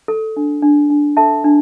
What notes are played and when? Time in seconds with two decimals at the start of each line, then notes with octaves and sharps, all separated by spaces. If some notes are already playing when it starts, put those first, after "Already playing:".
0.08 A4
0.37 D4
0.62 D4
0.90 D4
1.17 A4 E5 A5
1.44 D4